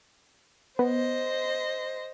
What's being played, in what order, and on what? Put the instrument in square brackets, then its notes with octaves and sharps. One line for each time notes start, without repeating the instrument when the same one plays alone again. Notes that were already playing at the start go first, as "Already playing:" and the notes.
[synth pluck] B3 [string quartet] C5 D#5